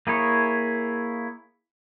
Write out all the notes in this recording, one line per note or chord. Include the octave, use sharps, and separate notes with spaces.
A#3 E4 G#4 C#5